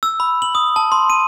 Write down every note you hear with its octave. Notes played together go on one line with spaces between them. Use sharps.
E6
B5
F#7
D#6
A5
C6
D#7